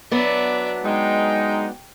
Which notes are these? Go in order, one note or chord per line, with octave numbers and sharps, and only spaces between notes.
F#3 B3 D4 D5 E5
G#3 D#4 G5